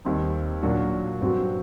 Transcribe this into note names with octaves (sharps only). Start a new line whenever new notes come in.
D#2 D#3 G3 C4 D#4
A#2 F#3 A#3 D4 F#4
G2 F#3 C4 F#4